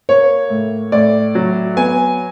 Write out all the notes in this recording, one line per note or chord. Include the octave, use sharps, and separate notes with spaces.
A#3 C#5
A2
A2 D5
F#3
B3 G#5